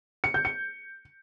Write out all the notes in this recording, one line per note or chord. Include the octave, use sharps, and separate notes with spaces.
C#7
G6
C#7